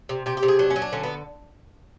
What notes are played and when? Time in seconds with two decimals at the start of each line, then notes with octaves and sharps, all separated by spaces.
0.09 C3
0.26 C3 G4
0.37 G4
0.43 C3
0.48 G#4
0.59 F#3 D4
0.70 C#4
0.76 F#3
0.82 D4
0.92 D3 C#4
1.03 B3